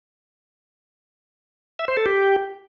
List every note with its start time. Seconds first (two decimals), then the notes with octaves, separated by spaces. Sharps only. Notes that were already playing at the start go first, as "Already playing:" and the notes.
1.79 E5
1.88 C5
1.97 A4
2.06 G4